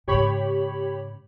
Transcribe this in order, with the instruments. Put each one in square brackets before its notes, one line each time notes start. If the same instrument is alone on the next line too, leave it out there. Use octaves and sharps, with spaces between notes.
[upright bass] G#2 C#3 [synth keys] G4 C#5 B5